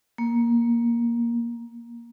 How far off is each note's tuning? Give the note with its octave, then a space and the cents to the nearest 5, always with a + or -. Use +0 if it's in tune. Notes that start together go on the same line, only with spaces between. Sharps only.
A#3 +10